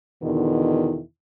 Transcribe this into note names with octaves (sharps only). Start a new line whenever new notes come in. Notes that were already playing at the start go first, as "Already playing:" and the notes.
E2 B2 D3 D#3 E4